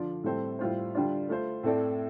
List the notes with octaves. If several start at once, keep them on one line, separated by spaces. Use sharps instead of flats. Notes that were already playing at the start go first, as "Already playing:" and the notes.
Already playing: D3 F3 D4 F4 D5
A2 G3 C4 A4 C5
A2 G3 F4 C5
D3 G3 D4 F4
A3 F4 C5
A2 A3 C4 A4 D5